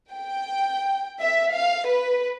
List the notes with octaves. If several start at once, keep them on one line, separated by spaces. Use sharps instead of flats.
G5
E5
F5
B4